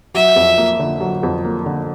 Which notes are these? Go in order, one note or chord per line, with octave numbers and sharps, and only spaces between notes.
F#3 E5
F2
A#3
D3
F#3
F2
A#3
D3